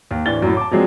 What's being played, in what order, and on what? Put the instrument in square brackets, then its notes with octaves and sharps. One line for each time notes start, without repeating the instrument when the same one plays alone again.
[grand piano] D#2
D1 E3 D4 A6 G7
F#2 A2
A5 D6
F3 F#3 G#3 C4 D4